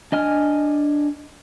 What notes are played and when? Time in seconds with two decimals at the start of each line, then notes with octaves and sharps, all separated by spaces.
0.12 D4 D#5 G#5 F6